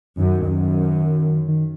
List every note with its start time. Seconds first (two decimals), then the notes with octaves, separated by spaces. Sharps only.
0.18 F#2 D#3
0.47 F#2
1.48 D#3